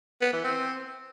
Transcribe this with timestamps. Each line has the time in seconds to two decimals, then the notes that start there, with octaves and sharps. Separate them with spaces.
0.22 B3
0.33 E3
0.44 C4